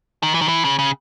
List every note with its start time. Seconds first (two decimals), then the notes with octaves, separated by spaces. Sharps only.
0.23 D#3
0.34 E3
0.41 D#3
0.48 E3
0.65 C#3
0.79 C#3